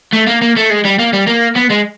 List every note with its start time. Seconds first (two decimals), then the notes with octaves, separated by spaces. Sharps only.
0.13 A3
0.27 A#3
0.42 A#3
0.56 A3
0.70 G#3
0.85 G3
0.99 A#3
1.13 G3
1.28 A#3
1.56 B3
1.70 G#3